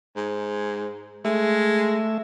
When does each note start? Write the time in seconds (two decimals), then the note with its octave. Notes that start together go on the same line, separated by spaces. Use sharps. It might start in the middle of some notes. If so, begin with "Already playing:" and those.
0.16 G#2
1.25 G#3 A3 E5